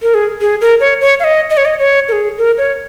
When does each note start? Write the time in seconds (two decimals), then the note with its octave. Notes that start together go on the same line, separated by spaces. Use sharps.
0.02 A#4
0.14 G#4
0.41 G#4
0.61 A#4
0.80 C#5
1.01 C#5
1.20 F5
1.24 D#5
1.50 D#5
1.57 C#5
1.65 D#5
1.79 C#5
2.08 A#4
2.12 G#4
2.38 A#4
2.58 C#5